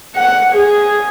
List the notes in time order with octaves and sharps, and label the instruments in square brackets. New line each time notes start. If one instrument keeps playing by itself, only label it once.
[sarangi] F#5
G#4